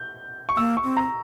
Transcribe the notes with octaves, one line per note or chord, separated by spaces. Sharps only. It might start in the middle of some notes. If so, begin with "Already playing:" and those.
Already playing: G6
C#6
A#3 E6
C#6
C4
A#5